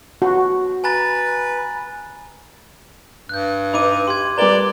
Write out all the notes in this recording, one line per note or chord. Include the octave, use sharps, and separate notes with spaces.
F#4
B4 G#5 A#5 A6
G2 F#6 G6
D#4 B4 B5 D6 D#7
G4 C6 G#6
G3 A#4 B4 D5 A#5 G7